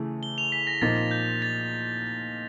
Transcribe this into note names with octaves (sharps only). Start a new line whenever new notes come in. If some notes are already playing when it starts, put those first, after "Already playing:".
Already playing: C#3 E3 A3
G7
F7
B6
A#6
A#2 F3 A#3 D#4 A6
G6
A6